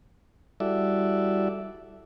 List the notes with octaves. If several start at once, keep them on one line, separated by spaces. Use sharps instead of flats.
G3 E4 F#4 A4 D5 E5